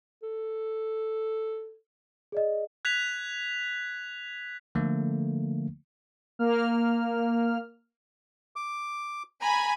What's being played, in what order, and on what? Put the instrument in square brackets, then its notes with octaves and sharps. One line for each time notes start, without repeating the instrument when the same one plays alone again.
[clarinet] A4
[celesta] G#4 D5 D#5
[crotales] F#6 G#6 B6 F7
[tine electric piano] D3 F3 A3 A#3
[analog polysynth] A#3 F6
[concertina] D6
[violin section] G#5 B5 [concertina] A#5